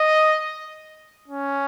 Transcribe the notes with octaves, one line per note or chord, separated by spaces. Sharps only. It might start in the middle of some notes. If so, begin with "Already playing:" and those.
Already playing: D#5
C#4